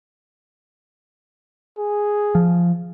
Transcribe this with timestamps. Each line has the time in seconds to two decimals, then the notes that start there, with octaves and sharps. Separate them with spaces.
1.78 G#4
2.35 F3